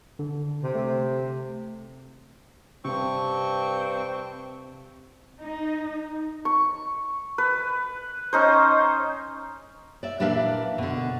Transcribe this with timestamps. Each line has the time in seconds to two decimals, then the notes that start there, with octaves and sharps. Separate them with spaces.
0.19 D3
0.63 C3
0.75 A3
2.85 G2 C3 C4 C#6
5.40 D#4
6.45 C#6
7.38 B4
8.33 C#4 D#4 C5
10.03 D5 E5
10.20 A#2 E3 D4 B4 E5 F5
10.78 B2 D3